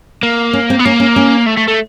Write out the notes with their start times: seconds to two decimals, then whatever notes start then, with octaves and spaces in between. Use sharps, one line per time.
0.23 A#3
0.53 C#4
0.70 C4
0.79 B3
0.85 A#3 C#4
1.00 C#4
1.16 C#4
1.46 A3
1.57 A3
1.68 A3